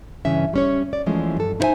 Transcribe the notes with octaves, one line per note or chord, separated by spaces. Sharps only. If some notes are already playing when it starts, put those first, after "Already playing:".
G2 C#3 E3 C#4 E5
G3 C#4 C#5
D5
E3 F3 G#3 A3 C#4
G2 A4
D#4 E4 C5 C#5 E5 G#5